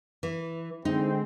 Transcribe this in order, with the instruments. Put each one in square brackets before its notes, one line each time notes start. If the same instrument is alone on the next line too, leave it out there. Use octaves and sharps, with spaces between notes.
[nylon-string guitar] E3
[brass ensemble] D3 G#3 C4 [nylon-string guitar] D#4